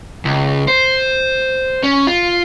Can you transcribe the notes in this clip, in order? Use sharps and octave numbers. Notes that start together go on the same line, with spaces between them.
C#2
C5
C#4
F4